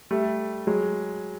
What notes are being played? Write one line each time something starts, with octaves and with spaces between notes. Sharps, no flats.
G3 A3
F#3 G#3